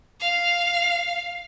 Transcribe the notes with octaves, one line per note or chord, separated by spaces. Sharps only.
F5